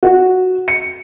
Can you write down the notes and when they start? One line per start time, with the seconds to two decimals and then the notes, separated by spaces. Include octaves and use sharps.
0.03 F#4
0.68 C#7